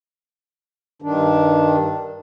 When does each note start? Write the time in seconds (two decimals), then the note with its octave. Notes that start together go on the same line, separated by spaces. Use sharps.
1.02 G2 D#3 D4